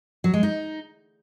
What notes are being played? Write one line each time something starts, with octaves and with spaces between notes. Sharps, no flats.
F#3
G#3
D#4